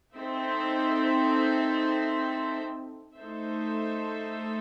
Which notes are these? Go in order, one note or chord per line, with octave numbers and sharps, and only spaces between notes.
C4 D#4 A4 C5 E5
A3 D#4 A4 C5 E5